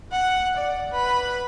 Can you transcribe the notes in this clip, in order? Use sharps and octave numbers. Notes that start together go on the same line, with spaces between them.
F#5
D5
B4